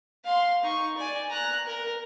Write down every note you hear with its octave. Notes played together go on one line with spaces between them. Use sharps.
F5 C6
D#4 C#6
D5 G#5
A#5 F#6
A#4